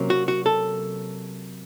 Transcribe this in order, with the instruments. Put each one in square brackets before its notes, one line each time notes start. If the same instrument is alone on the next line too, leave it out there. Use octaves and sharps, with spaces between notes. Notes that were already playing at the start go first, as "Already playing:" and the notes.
Already playing: [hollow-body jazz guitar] C3 F#3 A#3 C#4
F#4
F#4
A4